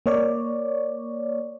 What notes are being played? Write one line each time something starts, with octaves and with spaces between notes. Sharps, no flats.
A#3 C#5 D5